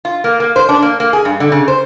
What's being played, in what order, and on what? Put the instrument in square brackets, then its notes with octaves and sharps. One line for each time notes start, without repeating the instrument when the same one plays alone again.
[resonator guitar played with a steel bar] F4
A#3
A#3
C5
D4
A#3
A#3
G#4
G2
D3
C#3
C5